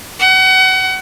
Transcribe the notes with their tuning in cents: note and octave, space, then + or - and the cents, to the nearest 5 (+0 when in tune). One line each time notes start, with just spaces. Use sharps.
F#5 +30